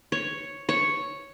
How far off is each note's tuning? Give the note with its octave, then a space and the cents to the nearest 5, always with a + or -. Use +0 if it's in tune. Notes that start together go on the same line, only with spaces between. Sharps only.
C#5 +0
C#5 +0